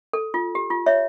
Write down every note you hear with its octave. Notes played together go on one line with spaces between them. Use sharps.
A4
F4
G4
F4
C#5 E5